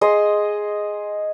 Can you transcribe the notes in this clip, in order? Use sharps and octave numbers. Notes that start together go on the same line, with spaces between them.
G#4 D#5 C6